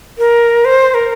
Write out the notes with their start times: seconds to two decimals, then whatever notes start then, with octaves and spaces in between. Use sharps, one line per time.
0.18 A#4
0.65 C5
0.94 A#4